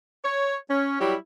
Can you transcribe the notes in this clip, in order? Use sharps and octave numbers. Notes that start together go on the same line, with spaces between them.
C#5
C#4
F#3 G3 E4 G4